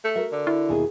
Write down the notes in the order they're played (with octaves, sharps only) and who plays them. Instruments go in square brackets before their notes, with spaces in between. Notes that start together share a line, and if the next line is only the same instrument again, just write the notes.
[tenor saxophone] A3
[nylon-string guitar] F#4 A#4 E5
[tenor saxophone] D3
[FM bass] E4
[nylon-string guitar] D#2 B2 G#4